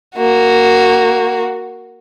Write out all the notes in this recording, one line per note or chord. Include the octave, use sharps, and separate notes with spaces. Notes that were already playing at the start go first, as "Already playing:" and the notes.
A#3 F#4